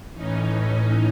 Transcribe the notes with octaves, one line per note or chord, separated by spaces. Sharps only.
A2 E3 C#4 D#4